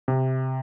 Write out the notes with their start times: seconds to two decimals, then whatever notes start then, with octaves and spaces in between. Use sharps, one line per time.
0.08 C3